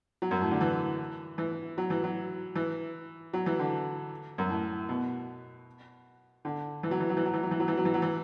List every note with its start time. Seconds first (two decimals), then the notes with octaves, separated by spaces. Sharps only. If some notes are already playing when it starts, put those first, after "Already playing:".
0.22 F#3
0.31 F#2
0.41 A2
0.51 D3
0.61 E3
1.38 E3
1.78 F#3
1.90 E3
2.04 F#3
2.56 E3
3.33 F#3
3.46 E3
3.59 D3
4.38 F#2
4.50 A2
4.89 B2
6.45 D3
6.83 E3
6.91 F#3
7.00 E3
7.09 F#3
7.17 E3
7.25 F#3
7.34 E3
7.43 F#3
7.51 E3
7.60 F#3
7.68 E3
7.77 F#3
7.85 E3
7.94 F#3
8.02 E3